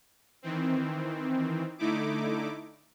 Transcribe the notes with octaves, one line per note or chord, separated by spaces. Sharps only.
D#3 E3 C4
D3 A3 D#4 E4 D6